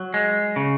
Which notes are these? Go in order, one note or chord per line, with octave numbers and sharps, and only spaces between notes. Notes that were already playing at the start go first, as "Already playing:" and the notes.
Already playing: F#3
G#3
C#3